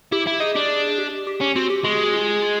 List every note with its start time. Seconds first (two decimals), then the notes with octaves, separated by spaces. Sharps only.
0.12 E4 G4
0.27 E4
0.40 D#4 G#4
0.54 D4 G4
0.68 G#4
0.98 G4
1.27 G4
1.41 C#4
1.56 C4 F#4
1.70 G4
1.84 G#3 F#4
2.14 F4
2.42 F4